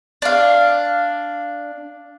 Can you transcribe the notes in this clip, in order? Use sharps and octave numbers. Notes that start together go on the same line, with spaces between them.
D4 F5